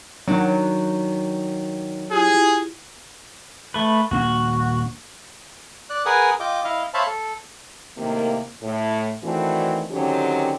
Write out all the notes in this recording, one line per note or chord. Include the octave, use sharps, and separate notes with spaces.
D#3 F#3 D4
E4 F4 G4 G#4
A3 B4
D#1 A#3 D4 F#4
D5 F#6
G#4 A#4 B4 F#5 G#5 D#6
F4 D#5 G5 D6
E4 D#5 F5
C5 C#5 E5 F5 A5 B5
A4
A2 C3 D#3 A#3
A2
D#3 E3 A3 C4 D4 F#4
D3 D#3 F#3 C4 C#4 G4